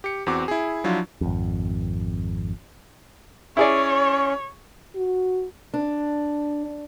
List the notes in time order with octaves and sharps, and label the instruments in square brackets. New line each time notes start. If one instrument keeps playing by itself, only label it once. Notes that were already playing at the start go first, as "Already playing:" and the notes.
[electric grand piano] G4 C#7
E2 C4 F#4 D6
E4 G#4
F3 F#3 D4 E4 F4
[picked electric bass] G#1 F2
[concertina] C#4 [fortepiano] E4 G#4 D5 [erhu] C#5
[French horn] F#4
[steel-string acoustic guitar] D4